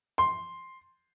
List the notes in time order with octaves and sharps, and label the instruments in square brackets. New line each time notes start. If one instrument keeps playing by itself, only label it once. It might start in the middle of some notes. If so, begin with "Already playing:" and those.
[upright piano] C6